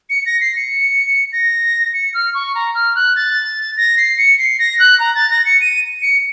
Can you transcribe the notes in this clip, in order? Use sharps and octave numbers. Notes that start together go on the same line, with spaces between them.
C#7
A#6
C7
C#7
A#6
C#7
F6
C#6
A#5
F6
F#6
A6
A#6
C7
C#7
C7
A#6
F#6
A#5
A6
A#6
C#7
D#7
C#7